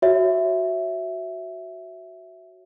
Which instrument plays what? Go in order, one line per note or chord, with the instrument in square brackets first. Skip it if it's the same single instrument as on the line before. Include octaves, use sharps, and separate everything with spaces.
[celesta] F#4 C#5 E5